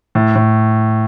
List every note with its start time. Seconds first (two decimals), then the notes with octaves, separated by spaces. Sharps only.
0.15 A2
0.35 A2